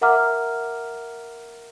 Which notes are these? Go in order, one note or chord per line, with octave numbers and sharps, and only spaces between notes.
A#4 E5 F#5 A#5 D6 F6